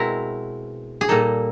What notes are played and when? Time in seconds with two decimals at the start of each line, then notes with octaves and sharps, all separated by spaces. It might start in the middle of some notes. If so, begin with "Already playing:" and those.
Already playing: B2 G#3 C4 E4 A#4
1.01 G#4
1.08 A#2 G3 A#3 D#4 A4